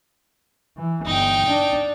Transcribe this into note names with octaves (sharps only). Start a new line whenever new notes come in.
E3
G1 D#4 G5
D4